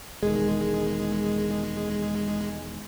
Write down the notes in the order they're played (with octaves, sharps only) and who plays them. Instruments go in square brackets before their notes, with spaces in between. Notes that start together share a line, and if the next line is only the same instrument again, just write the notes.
[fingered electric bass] E1 D#3 [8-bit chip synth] G#3 [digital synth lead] G#4